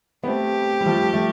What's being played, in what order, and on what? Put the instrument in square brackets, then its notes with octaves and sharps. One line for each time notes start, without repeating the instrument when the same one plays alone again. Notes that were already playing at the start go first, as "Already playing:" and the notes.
[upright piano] B3
[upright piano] A3 C4 [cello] G4
[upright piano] G3
F3 A3
A3